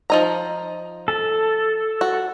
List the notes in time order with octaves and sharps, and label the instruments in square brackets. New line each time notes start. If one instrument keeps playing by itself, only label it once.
[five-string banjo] F3 D#4 A#5
[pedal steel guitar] A4
[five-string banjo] F#4